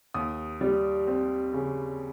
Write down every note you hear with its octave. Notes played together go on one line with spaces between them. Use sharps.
D#2 D#6
G3
C4
C#3